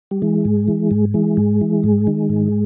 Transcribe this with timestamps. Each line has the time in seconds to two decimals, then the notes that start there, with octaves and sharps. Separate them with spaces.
0.11 G3
0.22 E3 G#3
0.45 G#2
0.68 E3
0.91 G#2
1.14 E3 G#3
1.37 G#2
1.61 E3
1.84 G#2
2.07 D#3
2.29 G#2